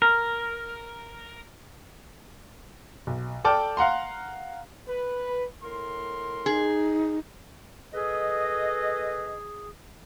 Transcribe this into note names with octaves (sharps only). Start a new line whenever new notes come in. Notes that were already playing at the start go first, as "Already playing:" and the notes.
A#4 F6
B1
A4 D5 G5 A5 D6 F6
F5 F#5 A#5 C6
B4
A2 A#4 C6
D#4 G#4
G#4 A4 B4 D#5